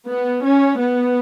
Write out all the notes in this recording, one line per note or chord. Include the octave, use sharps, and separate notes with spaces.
B3
C#4
B3